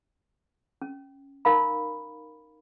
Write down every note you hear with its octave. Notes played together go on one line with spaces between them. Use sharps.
C#4
D#4 A#4 F5 A#5 B5